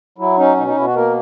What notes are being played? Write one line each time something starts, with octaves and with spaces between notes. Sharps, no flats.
F#3 E4
C#4 D#4
B2 D#4
D#4
B2 E4
F#4
A#3 A#4